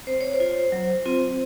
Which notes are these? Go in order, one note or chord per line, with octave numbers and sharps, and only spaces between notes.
C4 C5
C#5
C5
F4
F#3
C4 F4